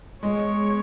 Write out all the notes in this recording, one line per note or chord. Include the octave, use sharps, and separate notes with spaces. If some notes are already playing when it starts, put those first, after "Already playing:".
G#3 B3 G#4 C#5